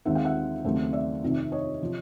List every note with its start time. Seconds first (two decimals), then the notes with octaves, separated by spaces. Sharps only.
0.05 D#2 D#3 G#3 C4 E5 F#5
0.15 F5 G5
0.25 E5 F#5
0.64 D#2 C#3 F#3 A3 C4
0.93 D5 E5
1.23 F2 C3 D#3
1.52 C#5 D#5
1.81 C3 F3